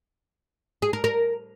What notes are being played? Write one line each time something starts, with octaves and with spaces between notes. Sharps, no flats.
G#4
A#4
A#4